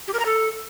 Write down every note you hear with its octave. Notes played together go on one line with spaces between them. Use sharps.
G4
A#4
A#5
A4